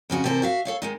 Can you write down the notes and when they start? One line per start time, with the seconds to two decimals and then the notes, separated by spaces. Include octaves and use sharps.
0.10 F2 C#3 F#4 G#4
0.24 C3 E3 A4 A#4 C5
0.42 F#4 E5 F5
0.65 A4 C#5 F5
0.82 D#3 G#3 D#4